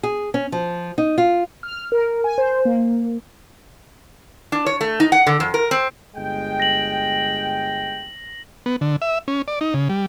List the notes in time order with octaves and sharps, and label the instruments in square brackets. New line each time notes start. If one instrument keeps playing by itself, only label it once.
[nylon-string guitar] G#4
C#4
F3
D#4
F4
[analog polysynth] F6
A#4
G#5
C5
A#3
[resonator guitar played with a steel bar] D4
C#5
A3
D#4
F#5
D3
F2
A#4
C4
[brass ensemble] G1 G#3 G5
[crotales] A#6 F#7
[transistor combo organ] B3
D3
E5
C#4
D5
D#4
C#3
G3